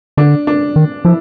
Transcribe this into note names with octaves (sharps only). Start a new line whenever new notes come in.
D3 D4
D4
D#3
F3 E4